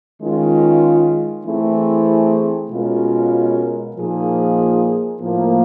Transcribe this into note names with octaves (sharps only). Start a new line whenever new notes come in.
D#3 G#3 C#4 F4
E3 A3 C4 E4 G#4
B2 G#3 C#4 F4 A#4
A#2 F3 A#3 D#4 G#4
A2 F3 A#3